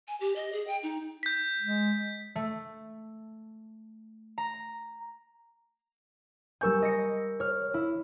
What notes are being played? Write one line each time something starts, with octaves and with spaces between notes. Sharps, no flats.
G#5
G4
D#5
G#4
G5
D#4
G6 B6
G#3
A3
A#5
G3 A#4 G#5 C#6 E6 G6
D#5 A#6 C#7
C#5 F6
E4